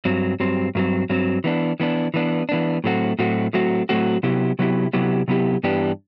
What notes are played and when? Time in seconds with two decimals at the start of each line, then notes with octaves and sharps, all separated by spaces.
0.05 G2 F#3 C4
0.40 G2 F#3 C4
0.75 G2 F#3 C4
1.09 G2 F#3 C4
1.44 E3 B3 D4
1.80 E3 B3 D4
2.14 E3 B3 D4
2.49 E3 B3 D4
2.84 A2 F#3 A3 C4 F#4
3.19 A2 F#3 A3 C4 F#4
3.53 A2 F#3 A3 C4 F#4
3.89 A2 F#3 A3 C4 F#4
4.23 C3 F#3 B3 E4 G4
4.59 C3 F#3 B3 E4 G4
4.93 C3 F#3 B3 E4 G4
5.28 C3 F#3 B3 E4 G4
5.63 G2 E3 B3 D4 G4